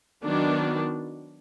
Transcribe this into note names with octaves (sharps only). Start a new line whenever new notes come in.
D#3 F#3 B3 D4